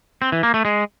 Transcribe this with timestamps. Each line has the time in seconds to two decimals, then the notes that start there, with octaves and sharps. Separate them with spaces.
0.22 C4
0.32 E3
0.43 A#3
0.54 A3
0.65 G#3